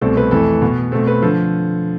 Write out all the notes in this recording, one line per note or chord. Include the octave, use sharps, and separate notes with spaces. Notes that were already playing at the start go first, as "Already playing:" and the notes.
C2 B2 A3 C4 A4
B4
F2 E3 A3 A4
B2 B3
B2 A3 C4 A4
B4
D3 F3 A4